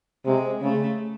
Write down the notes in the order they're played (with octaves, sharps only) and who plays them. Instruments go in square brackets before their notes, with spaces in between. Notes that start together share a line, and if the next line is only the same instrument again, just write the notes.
[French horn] C3 [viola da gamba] G#3
[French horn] C#3 [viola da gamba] A3